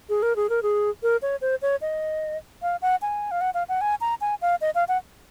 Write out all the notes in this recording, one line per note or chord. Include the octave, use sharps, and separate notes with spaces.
G#4
A#4
G#4
A#4
G#4
A#4
C#5
C5
C#5
D#5
F5
F#5
G#5
F5
F#5
F5
F#5
G#5
A#5
G#5
F5
D#5
F5
F#5